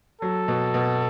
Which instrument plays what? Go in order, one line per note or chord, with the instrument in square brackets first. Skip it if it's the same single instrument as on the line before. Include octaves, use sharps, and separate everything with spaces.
[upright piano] F#3 [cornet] A4
[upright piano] B2
B2